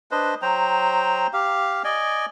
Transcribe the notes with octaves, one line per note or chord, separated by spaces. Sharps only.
D4 B4 C5 D#5
F#3 C5 G5 A#5
G4 F5
D5 D#5 G#5